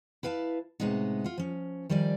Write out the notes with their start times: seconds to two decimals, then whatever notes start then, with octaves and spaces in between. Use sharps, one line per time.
0.23 E4 B4 F5 F#5 A5
0.80 A2 C3 G#3 B3 D#4
1.24 F4 F#5
1.38 F3 C#4
1.89 D#3 F3 G3 D5 G#5